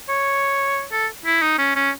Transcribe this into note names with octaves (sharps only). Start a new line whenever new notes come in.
C#5
A4
E4
D#4
C#4
C#4